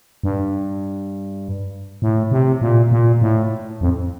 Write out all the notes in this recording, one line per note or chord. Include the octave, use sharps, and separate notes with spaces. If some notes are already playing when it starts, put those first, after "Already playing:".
G2
A2
C3
A#2
A#2
A2
F2